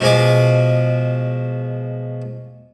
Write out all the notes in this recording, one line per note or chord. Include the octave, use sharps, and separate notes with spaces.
B2 F3 G#3 G#5 D6